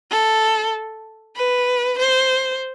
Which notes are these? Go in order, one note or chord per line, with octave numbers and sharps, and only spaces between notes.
A4
B4
C5